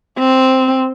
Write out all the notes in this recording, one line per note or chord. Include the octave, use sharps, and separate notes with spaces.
C4